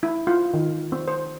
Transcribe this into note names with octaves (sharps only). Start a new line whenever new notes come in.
E4
F4
D#3
C4
C5